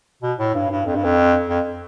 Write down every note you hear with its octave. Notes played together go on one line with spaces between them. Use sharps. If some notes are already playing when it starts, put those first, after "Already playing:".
B2
A2
G2
G2
F2
G2
F2
F2